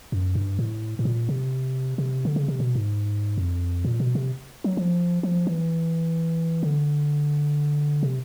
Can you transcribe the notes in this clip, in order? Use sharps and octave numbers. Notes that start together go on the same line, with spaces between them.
F#2
G2
A2
A2
A#2
C3
C3
D3
C#3
C3
B2
G#2
F2
A#2
B2
C3
F#3
F3
F3
E3
D3
C3